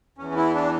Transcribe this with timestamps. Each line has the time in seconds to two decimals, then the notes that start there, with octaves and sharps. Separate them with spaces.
0.18 E2 E3 C#4
0.36 E4
0.54 D4